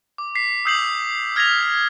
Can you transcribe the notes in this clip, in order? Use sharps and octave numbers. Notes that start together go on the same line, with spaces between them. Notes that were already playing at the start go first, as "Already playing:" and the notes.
D6
B6 C7
D#6 E6 G6 C7 F7 F#7
F6 G#6 A#6 B6 F7